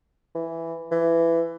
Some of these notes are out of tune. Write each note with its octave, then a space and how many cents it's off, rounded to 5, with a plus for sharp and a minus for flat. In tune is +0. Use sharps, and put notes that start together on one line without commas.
E3 +5
E3 +15